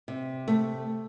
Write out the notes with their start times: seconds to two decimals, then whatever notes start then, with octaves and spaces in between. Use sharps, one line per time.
0.08 C3
0.48 A3